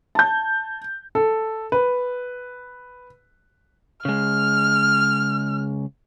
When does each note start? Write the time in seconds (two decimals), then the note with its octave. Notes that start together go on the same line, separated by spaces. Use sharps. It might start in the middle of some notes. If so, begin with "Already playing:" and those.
0.15 A5 G6
1.15 A4
1.72 B4
4.05 C#3 G#3 F6